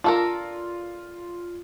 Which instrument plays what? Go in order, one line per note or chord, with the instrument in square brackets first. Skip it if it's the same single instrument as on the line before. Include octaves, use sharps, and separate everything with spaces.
[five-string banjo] D4 A4 A#4 [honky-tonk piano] F4